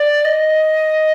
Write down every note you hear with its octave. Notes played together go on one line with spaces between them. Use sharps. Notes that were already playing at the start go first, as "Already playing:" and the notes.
Already playing: D5
D#5